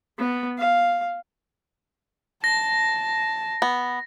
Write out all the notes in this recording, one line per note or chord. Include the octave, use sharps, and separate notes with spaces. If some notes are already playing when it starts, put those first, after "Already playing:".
B3
F5
A5 A#6
B3